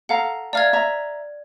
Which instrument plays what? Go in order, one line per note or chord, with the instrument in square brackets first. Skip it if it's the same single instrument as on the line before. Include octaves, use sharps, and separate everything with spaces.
[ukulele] A4 F5 A#5 [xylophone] F#5
[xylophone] D5 F6 G#6 [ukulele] E5 F5 A#5
[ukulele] E5 A#5